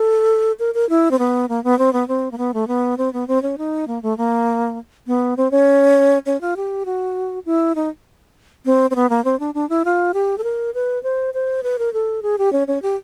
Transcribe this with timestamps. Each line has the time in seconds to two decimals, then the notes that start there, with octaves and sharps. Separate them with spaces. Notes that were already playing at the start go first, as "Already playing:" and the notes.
Already playing: A4
0.59 A#4
0.74 A#4
0.89 E4
1.11 C4
1.19 B3
1.49 A#3
1.64 B3
1.79 C4
1.93 B3
2.08 C4
2.31 A#3
2.38 B3
2.54 A3
2.68 B3
2.98 C4
3.13 B3
3.28 C4
3.42 C#4
3.58 D#4
3.88 A#3
4.03 A3
4.18 A#3
5.07 B3
5.37 C4
5.51 C#4
6.26 C#4
6.41 F4
6.57 G4
6.85 F#4
7.46 E4
7.75 D#4
8.65 C4
8.91 C4
8.95 B3
9.10 A#3
9.25 C4
9.40 D4
9.54 D4
9.69 E4
9.85 F4
10.14 G4
10.38 A4
10.44 A#4
10.74 B4
11.03 C5
11.34 C5
11.63 B4
11.79 A#4
11.93 A4
12.23 G#4
12.38 G4
12.53 C#4
12.68 C#4
12.82 G4